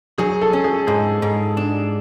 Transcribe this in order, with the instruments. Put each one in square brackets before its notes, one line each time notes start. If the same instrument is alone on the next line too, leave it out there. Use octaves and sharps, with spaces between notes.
[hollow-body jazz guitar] F#3 [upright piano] G#4
[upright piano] A4
[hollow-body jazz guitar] C#4
[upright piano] G#4
[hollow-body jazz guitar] G#2 [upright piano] G#4
[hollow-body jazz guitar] G#2
D4